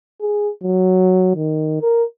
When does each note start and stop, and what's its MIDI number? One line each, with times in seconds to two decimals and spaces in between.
0.21 0.50 68
0.63 1.35 54
1.36 1.81 51
1.82 2.04 70